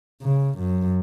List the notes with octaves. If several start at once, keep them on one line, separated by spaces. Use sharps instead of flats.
C#3
F#2